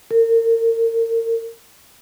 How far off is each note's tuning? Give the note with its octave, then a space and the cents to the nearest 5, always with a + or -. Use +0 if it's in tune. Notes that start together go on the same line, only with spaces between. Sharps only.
A#4 -35